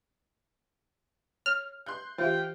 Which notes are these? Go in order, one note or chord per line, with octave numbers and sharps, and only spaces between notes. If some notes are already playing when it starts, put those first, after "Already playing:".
C#5 F6
C6 F#6 G6
E3 F4 G4 E5 G5